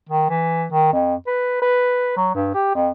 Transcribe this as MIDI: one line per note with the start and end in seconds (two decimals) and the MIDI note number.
0.09 0.28 51
0.30 0.66 52
0.72 0.92 51
0.93 1.14 41
1.27 1.61 71
1.62 2.12 71
2.17 2.32 54
2.35 2.51 43
2.54 2.71 67
2.75 2.89 41